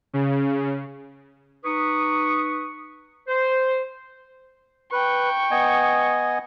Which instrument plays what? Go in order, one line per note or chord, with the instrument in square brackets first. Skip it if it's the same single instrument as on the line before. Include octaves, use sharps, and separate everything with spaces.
[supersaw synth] C#3
[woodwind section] D#4 B4 C#6 D#6
C5
[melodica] B4 [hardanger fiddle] G5 C#6
[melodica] B3 D#5 G#5